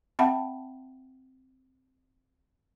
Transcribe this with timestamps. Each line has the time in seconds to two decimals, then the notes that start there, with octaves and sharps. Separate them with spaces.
0.19 C4 E5 F#5 G5 A5 B5